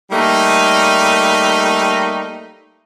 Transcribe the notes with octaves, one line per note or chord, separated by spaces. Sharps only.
G3 A3 A#3 D#4